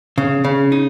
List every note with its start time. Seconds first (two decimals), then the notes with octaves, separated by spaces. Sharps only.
0.18 C#3
0.45 C#3
0.72 D#4